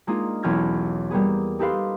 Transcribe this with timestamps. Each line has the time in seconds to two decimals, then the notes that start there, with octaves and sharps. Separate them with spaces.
0.07 G#3 A#3 D4 D#4 F4 G#4
0.43 B1 E2 C#4 F6 G#6 A#6
1.10 G3 A#3 B3 G#4
1.59 D#4 G4 A4 B4 F5 C6